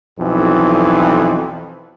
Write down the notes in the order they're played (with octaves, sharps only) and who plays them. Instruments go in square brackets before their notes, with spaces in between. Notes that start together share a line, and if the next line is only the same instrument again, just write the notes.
[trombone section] B1 F2 E3